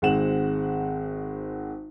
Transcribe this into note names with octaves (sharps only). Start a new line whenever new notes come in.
G#1 G#3 C4 F#5 E7 F#7